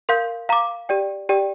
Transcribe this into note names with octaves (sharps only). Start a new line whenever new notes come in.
A#4 F5 C6 G6
F5 A#5 D6
G4 D5 G5
G4 D5 G5